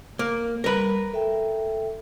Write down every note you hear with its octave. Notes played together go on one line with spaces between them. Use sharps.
A#3
G3 A#4 B4
A4 E5 G5